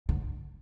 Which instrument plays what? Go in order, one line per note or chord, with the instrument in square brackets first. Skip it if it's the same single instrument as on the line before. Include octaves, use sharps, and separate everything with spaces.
[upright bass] D3